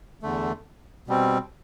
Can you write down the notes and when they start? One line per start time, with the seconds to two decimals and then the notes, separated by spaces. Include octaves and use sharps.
0.23 E2 D3 A3
1.08 B2 G3 C4